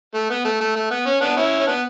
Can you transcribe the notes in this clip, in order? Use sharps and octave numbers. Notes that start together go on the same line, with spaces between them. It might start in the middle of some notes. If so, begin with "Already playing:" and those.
A3
B3
A3
A3
A3
B3
C#4
B3 D4
C#4 E4
C#4
B3 D4